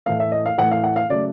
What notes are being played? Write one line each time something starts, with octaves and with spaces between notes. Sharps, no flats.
A2 E3 A3 F5
E5
D#5
F5
A2 E3 A3 F#5
F5
F#5
F5
C#3 F#3 A3 D5